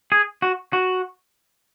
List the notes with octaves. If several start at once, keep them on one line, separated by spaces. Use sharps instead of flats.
G#4
F#4
F#4